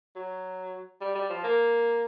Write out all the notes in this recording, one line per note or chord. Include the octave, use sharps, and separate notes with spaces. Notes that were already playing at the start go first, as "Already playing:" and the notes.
F#3
G3
G3
F3
A#3